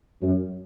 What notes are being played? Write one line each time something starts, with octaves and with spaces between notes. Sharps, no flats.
F#2